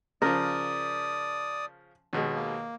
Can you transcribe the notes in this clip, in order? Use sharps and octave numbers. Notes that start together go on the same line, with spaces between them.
C#3 F3 A#4 D5 D#6
D#2 B2 G#3
A#3